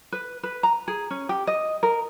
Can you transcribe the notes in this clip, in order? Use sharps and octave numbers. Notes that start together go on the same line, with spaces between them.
B4
B4
A#5
G#4
C#4
G4
D#5
A#4